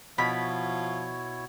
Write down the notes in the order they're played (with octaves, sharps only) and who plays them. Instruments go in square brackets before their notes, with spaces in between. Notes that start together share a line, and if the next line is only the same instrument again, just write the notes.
[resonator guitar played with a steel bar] B2 [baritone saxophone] F3 [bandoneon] E4 C#5 [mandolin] B5